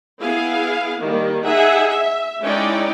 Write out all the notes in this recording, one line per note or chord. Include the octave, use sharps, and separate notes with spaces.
B3 E4 G#4 F5
D#3 G3 A#3
D#4 G#4 E5 F#5
E5
G#3 C#4 D#4 E4 D5 G5